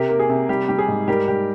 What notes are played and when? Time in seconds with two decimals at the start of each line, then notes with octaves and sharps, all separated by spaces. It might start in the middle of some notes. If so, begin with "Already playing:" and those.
Already playing: C3 G4 A#4
0.09 A#3
0.19 G#4
0.29 C3
0.49 G3 G4
0.68 G3 G4
0.79 G#4
0.88 G#2
1.08 G3 G4 A#4
1.28 G3 G4